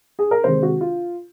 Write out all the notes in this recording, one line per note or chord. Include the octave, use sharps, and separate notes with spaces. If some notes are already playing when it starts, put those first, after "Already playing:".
G#4
A#4
C3 D#3 G#3 C5
F#4
F4